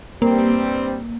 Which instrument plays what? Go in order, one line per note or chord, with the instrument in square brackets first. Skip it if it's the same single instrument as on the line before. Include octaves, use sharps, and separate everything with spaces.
[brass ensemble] G2 G3 C4 [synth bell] A#3